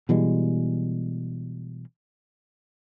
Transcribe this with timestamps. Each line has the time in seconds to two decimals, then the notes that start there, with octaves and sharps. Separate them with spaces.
0.09 B2 E3 G3 G#3